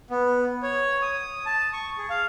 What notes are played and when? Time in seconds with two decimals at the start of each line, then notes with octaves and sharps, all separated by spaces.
0.10 B3
0.63 C#5
1.02 D#6
1.46 A5
1.73 C#6
1.98 G#4
2.10 F5